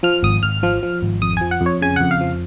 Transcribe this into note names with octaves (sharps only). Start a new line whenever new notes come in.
F3 F6
G#1 D#6
G#1 F6
F3
F3
G#1
F2 D#6
F3 G#5
F#5
F2
C#5
C#3 G#5
F2 F#5
F5
F3